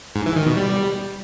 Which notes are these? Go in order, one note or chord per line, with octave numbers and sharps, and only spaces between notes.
G#2
E3
D#3
B2
G3